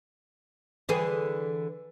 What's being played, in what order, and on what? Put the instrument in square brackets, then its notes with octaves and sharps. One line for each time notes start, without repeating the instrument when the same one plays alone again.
[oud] D3 E3 G#4